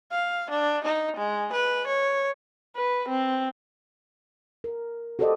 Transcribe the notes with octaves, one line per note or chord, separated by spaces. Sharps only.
F5
D4
D#4
G#3
B4
C#5
B4
C4
A#4
F#4 G4 A4 C5 D5 D#5